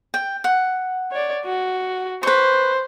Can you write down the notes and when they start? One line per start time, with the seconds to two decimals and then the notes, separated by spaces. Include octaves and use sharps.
0.14 G5
0.44 F#5
1.11 C#5 D5
1.45 F#4
2.23 B4 C5 C#6